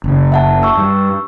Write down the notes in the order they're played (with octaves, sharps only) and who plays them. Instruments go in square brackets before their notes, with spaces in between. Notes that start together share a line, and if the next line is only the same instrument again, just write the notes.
[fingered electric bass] F#1 C#3
[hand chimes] E5 F#5 A5
C#6 E6
[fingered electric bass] G2